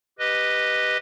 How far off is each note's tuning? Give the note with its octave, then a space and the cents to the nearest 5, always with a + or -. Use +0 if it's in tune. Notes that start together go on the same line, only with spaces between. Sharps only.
G4 +0 B4 +0 D#5 -5